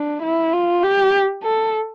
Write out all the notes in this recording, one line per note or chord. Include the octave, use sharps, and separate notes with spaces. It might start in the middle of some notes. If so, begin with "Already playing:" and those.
Already playing: D4
E4
F4
G4
A4